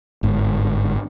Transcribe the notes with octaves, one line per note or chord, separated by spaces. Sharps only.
G1 G#2